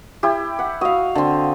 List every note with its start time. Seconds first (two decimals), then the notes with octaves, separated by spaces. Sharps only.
0.23 E4 G4
0.59 F#5
0.81 F#4 D#5 F5
1.15 D3 C4